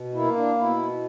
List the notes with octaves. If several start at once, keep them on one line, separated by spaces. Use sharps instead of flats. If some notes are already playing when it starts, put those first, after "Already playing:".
Already playing: B2
A#3 E4
D4
B2 E4